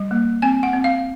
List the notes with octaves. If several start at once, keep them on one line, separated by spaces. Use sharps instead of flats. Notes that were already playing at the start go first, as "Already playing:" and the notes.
Already playing: G3
A#3
C4 G#5
F#5
C4
F5